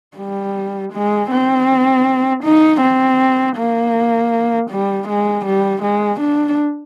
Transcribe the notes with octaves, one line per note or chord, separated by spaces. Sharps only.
G3
G#3
C4
D#4
C4
A#3
G3
G#3
G3
G#3
D4